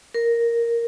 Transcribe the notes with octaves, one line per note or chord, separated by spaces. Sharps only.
A#4